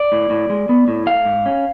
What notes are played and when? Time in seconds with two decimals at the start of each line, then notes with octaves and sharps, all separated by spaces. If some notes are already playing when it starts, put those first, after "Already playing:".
Already playing: D5
0.12 A2
0.30 A2
0.50 G#3
0.69 B3
0.88 A2
1.06 A3 F5
1.25 G#2
1.46 C#4